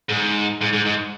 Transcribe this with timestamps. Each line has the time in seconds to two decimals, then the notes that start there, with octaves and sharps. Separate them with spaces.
0.09 G#2
0.61 G#2
0.73 G#2
0.85 G#2